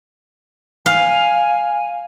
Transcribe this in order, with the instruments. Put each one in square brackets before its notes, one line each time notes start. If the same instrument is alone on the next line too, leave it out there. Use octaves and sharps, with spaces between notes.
[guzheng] F5 [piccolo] G#5